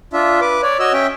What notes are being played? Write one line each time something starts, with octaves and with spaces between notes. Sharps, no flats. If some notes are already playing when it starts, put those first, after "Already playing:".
D4 F4 E5
B4 D6
C#5 D5
F#4 C#5 D#5 E6
C#4 E5 G5